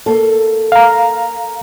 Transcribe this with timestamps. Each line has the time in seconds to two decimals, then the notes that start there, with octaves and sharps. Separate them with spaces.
0.06 A#3 A4
0.72 F5 A#5